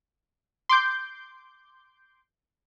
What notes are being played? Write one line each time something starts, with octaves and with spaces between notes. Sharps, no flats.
C6 D6 G6